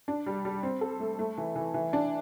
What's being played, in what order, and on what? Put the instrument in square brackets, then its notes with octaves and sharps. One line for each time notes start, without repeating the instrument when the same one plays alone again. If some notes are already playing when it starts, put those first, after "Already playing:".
[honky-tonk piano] D4
G3
G3
C4
A4
A3
A3
E3
E3
E3
D4